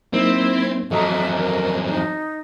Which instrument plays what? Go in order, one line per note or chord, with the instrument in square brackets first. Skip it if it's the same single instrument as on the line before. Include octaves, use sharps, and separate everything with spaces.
[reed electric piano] F#3 A#3 D#4 [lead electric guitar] C4 [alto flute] E4
[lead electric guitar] F2 F#3 [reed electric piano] A4 D#5 A#5 [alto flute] E5
[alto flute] A#4
D#4